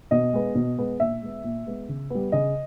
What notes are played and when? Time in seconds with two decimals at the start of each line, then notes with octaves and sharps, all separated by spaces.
0.11 B2 D#5
0.33 G#3 B3
0.55 B2
0.78 G#3 B3
1.00 A#2 E5
1.21 G#3 B3
1.44 A#2
1.66 G#3 B3
1.89 C#3
2.10 G3 B3
2.32 C#3 D#5